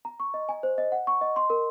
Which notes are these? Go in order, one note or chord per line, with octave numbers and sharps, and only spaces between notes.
A#5
C#6
D#5
G#5
C5
D#5
F#5
C#6
D#5
C6
A#4